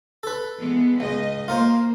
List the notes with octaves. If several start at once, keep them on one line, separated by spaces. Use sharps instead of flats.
A4 B4
E3 G#3 B3
C#2 D#5
A#3 F4 A#4 C5